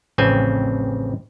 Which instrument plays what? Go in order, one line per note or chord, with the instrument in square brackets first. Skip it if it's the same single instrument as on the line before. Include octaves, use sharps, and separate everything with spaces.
[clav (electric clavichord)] A1 F2 C#3 C4 G#5